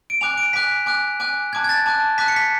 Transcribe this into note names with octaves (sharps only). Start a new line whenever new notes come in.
D7
G#5 D6 F#6 F7
D7
G#5 D6 F#6 B6
G#5 D6 F#6
G#5 D6 F#6
A5 D6 F#6 G#6
G#6
A6
A5 D6 F#6
A5 D6 F#6 B6
C#7
B6